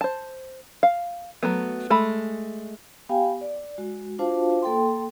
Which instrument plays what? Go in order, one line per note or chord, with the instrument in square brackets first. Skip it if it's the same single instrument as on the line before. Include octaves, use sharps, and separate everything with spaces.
[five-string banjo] C5 A5
F5
F#3 A3 B3
G#3 A3 B5
[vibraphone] B3 G4 F5 G5 G#5
D5
G#3 F#4
D4 F4 F#4 C5 F5 A5
A#3 A4 G5 C6